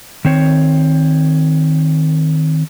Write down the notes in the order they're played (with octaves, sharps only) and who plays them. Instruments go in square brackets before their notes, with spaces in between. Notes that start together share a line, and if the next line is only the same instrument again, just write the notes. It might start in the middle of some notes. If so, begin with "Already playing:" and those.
[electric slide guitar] D#3 C4 C#5